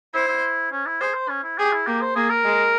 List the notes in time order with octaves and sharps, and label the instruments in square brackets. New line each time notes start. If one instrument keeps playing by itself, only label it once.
[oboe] E4 [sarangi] C5
[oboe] E4
C#4
E4
[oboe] G#4 [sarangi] C5
[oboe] C5
C#4
E4
[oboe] G4 [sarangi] G#4
[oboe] E4
[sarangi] A#3 [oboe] G4
[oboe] C5
[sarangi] A#3 [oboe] G#4
[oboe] A#4
[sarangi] G#3